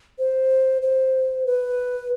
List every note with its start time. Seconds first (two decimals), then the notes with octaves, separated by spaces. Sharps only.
0.19 C5
0.82 C5
1.47 B4